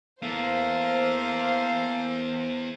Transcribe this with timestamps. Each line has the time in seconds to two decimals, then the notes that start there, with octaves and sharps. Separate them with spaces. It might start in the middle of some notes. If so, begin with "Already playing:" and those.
0.23 A#3 B3 E4 A4 C5 F5